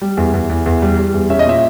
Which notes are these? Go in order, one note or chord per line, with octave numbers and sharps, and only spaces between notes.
G3
E2
E2
E2
E2
G3
G3
E2
C#4 E5
D#5
A#2 E5